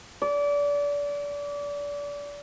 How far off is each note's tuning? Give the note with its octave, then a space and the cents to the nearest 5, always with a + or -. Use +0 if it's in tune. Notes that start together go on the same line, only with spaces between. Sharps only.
D5 -30